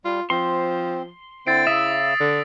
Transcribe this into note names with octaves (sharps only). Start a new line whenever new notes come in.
G3 F4
F3 C4 C6
D3 C4 E4 C5 A6 C7 D7
C#3 E5 D#6 E6 B6
D3